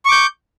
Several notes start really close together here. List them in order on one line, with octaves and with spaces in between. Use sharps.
C#6 D6 G6